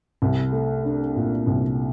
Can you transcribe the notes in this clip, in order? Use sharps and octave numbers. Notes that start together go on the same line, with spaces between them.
C2
A3
D4
A#2
C2